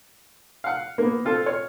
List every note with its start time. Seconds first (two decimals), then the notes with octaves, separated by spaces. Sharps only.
0.64 F5 F#5
0.98 A#3 B3
1.25 C4 F4 A4
1.46 C#5 F6